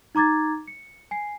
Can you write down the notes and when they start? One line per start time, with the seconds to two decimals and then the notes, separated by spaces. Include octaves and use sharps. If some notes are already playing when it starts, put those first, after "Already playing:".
0.15 D#4 A#5 D6 G#6 A6
0.68 C#7
1.11 G#5 C7